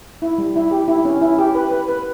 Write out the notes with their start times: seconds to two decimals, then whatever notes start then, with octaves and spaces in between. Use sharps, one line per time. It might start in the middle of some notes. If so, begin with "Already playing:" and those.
0.22 E4
0.38 G3
0.56 E4
0.71 G4
0.88 E4
1.05 C#4
1.21 E4
1.39 G4
1.55 B4
1.71 B4
1.88 B4